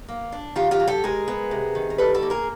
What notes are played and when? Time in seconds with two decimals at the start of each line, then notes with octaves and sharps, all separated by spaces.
0.08 A#3
0.32 D4
0.56 D#3 F4 G4
0.71 F4 G4
0.80 F#3
0.87 G4 A4
1.04 G#3 G#4 A#4
1.28 B3
1.51 C3
1.75 D#3
1.90 A#4
1.98 G3 A4 B4
2.14 A4 B4
2.22 A#3
2.30 G#4 A#4